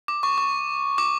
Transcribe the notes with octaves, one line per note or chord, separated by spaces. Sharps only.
D6
C#6
C#6
D6